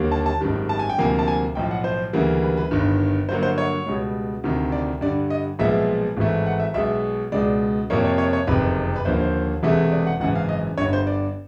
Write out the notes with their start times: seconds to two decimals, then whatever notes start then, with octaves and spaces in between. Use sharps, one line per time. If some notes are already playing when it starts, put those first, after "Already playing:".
Already playing: D#2 D3 G3 A#3
0.12 A5
0.26 A5
0.41 G#1 F#2 D#3 G3
0.69 A5
0.79 G#5
0.89 G5
0.98 D2 C3 F3 A#3 G#5
1.19 A5
1.28 G#5
1.55 B1 A2 F3 G5
1.71 F#5
1.84 C5
2.13 D2 C#3 E3 G3 A#3
2.42 B4
2.57 B4
2.71 G1 G2 D#3
3.29 G2 D3 F#3 A#3 C5
3.43 C5
3.58 C#5
3.86 C#2 B2 G3
4.44 D2 C3 D#3
4.72 D5
5.01 G2 D3 G3 D5
5.30 D#5
5.59 B1 A#2 F3 G#3 B3 E5
6.17 G#1 G#2 E3 A3
6.46 F#5
6.60 E5
6.74 B1 B2 G#3 E5
7.32 C#2 B2 G#3 D5
7.90 F2 C3 F3 A#3 C#5
8.04 C#5
8.18 C#5
8.33 C#5
8.47 F#1 F2 C3 D#3 B4
8.96 B4
9.05 D#2 D3 F3 A#3 C5
9.20 C5
9.63 E1 E2 C3 E3 A3
9.92 D5
10.07 F#5
10.20 G#1 F#2 C#3 E3 F#5
10.35 F5
10.49 D#5
10.78 G1 G2 D3 C#5
10.93 C5
11.07 D5